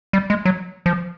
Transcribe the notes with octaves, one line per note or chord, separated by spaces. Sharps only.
G3
G#3
F#3
F3